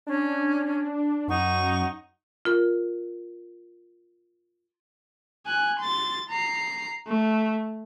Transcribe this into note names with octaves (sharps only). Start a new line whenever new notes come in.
C#4 D4
F#2 D#4 F#5 C#6
F4 A#4
G#5 F#6
C6 A6
A#5 C7
A3